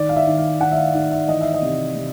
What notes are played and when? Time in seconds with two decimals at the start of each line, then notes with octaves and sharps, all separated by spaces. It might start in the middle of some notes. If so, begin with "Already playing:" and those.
Already playing: D#3 D5
0.09 F5
0.16 E5
0.27 D#3
0.38 F5
0.60 D#3 F#5
0.72 E5
0.77 F5
0.94 D#3 E5
1.11 E5
1.28 E3 D#5
1.41 E5
1.54 D#5
1.62 C3
1.96 C3